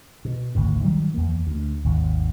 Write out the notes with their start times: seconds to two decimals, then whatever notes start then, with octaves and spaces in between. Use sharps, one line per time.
0.25 B2
0.55 G#1 D2 G#2
0.83 D#3 F#3 G3
1.14 E2 A#3
1.47 D2
1.84 G#1 D#2